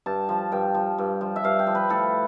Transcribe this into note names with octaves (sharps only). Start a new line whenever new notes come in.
G2 A5
F3
G2 G5
F3
G2
F3
E5
G2 F5
G5
F3
B4
A2 A4